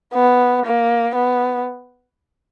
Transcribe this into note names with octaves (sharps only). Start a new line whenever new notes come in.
B3
A#3
B3